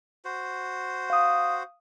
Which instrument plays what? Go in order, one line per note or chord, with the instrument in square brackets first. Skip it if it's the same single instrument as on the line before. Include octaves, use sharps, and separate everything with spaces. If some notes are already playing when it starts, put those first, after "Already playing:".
[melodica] F#4 C5
[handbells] F5 D#6